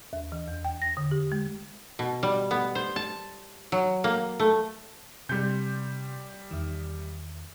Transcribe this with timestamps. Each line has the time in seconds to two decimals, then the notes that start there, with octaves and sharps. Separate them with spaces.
0.13 D#2
0.32 E3
0.48 E2
0.65 G5
0.82 A#6
0.97 D3
1.11 G4
1.32 G#3
1.99 B2
2.23 G3
2.51 B3
2.75 C5
2.96 A5
3.72 F#3
4.04 A#3
4.40 A3
5.29 C3 G3 G6
6.51 E2 D#3